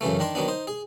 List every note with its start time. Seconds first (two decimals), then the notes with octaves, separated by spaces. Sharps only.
0.01 F#2 C#3 E3 A3
0.19 D#3 D4 A#4 C6
0.35 D#3 F#3 B3 D4
0.48 D#4 C5
0.67 G#4